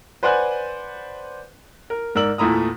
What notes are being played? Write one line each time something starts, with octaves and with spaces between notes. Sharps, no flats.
B4 C5 D5 F#5 G#5 F#6
A#4
G#2 A#4 D5 E6 F#7
E2 A#2 A3 E4 A#5 D#6